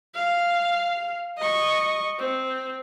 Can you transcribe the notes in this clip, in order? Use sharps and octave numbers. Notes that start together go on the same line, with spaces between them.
F5
D#5 C#6
C4